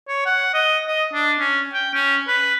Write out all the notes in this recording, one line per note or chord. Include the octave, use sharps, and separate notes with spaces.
C#5
F#5
D#5
D#5
D4
C#4
G5
C#4
B4